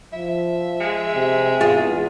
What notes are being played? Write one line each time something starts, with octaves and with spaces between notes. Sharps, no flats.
F3 E5
G#3
C3
E2 F4 G#4